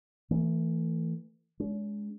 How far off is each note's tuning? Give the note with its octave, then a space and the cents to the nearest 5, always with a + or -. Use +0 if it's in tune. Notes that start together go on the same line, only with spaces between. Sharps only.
E3 +0 A3 +35
G#3 +0 C#4 +45